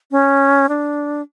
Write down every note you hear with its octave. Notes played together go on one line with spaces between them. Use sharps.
C#4
D4